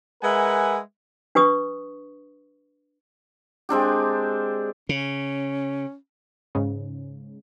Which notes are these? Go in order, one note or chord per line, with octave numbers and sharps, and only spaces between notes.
G#3 A#4 B4 E5 F#5 G#5
D4 B4 C#6 D#6
G#3 C4 D4 G4
C#3 C#4
G#2 C#3